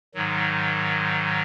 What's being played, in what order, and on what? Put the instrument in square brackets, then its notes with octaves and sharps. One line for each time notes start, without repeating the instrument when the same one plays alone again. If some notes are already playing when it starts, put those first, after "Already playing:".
[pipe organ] G#2 D#3 F#3